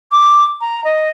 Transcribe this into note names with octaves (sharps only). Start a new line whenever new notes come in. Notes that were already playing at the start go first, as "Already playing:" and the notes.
D6
A#5
D#5